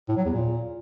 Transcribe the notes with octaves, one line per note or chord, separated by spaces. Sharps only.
A2
F#3
E2
A#2